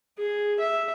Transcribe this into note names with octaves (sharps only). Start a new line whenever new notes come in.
G#4
E5